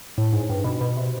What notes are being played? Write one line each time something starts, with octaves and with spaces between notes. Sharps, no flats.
A2
G#2
G2
B2
B2
C3